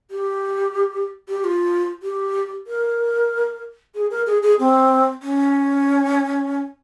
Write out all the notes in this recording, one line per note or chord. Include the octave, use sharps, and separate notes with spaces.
G4
G4
G4
F4
G4
A#4
G#4
A#4
G#4
G#4
C4
C#4